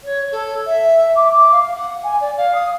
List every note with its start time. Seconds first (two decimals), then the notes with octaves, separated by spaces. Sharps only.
0.03 C#5
0.31 A4
0.66 E5
1.15 D6
1.51 F5
1.74 F#5
2.03 G#5
2.20 D5
2.36 F5
2.54 D#6